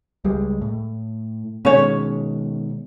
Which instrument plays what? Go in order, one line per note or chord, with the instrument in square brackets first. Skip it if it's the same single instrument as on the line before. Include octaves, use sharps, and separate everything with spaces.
[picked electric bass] C#2 G3 G#3
A2
[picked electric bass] B2 D#3 G#3 [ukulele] C#4 C#5